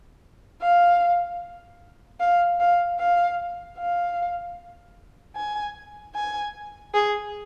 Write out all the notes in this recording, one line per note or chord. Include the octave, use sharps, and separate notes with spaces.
F5
F5
F5
F5
F5
G#5
G#5
G#4